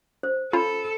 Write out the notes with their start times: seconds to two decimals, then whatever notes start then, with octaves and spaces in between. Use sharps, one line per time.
0.23 C5
0.53 C#4 F4 A4 B5